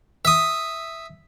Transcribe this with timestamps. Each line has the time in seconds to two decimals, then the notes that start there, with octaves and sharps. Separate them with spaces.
0.25 E5 D#6